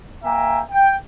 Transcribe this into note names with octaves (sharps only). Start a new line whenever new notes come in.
A#3 E5 G5 G#5 A#5
G5